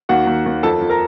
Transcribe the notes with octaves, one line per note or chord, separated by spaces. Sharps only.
D#2 F#4 F#5
D#2
D#2
F2 A4 A5
F2
A#4 A#5